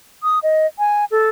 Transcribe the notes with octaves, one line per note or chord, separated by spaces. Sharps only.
D#6
D#5
G#5
A4